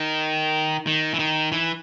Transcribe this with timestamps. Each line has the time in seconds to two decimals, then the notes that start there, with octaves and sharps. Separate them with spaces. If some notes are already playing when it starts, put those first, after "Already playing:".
Already playing: D#3
0.87 D#3
1.14 E3
1.19 D#3
1.52 E3